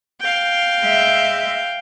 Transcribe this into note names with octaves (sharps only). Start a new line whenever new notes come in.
F5 G5
G#3 E5